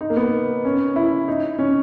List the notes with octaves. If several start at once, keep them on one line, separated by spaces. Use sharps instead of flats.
D#4
A#3
B3
C#4
E4
D#4
C#4